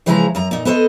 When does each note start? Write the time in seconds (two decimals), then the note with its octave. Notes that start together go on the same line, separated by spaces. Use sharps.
0.06 C#3 E3 F3 G#3 C5 A#5
0.35 F#2 A#5
0.51 A#2 D#4
0.65 B3 A4 C5 C#5 D#5